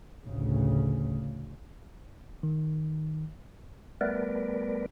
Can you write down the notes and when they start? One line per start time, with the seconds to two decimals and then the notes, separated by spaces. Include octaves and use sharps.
0.24 A1 D2 C#3
2.43 D#3
4.01 G3 A3 B3 A#4 B4 D5